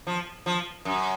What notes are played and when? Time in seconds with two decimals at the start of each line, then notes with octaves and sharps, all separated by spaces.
0.07 F3
0.46 F3
0.85 F#2